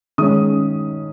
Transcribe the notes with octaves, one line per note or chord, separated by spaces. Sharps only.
D#3 G#3 C#4 D#6